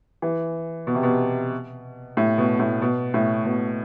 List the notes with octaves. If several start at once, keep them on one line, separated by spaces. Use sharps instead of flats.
E3
B2
C3
B2
A2
B2
A2
B2
A2
B2